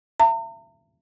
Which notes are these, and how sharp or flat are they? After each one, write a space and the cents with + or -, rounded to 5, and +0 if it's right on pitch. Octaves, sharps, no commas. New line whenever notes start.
E5 +35 A#5 -40